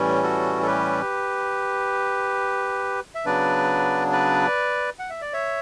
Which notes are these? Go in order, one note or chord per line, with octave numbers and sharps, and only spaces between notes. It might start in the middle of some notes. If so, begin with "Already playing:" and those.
Already playing: A2 E3 G3 C#4
F#4 A4
A4
G4 B4
E5
C#3 F#3 B3 D4 B4 D5
B4 D5
F#5
E5
D5
C#5 E5